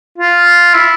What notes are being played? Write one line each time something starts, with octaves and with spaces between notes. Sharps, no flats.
F4
E4